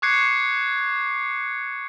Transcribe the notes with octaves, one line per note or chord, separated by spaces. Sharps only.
C#6 D6 F#6 G#6 C7 C#7